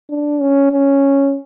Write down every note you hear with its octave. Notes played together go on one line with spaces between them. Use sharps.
D4
C#4
C#4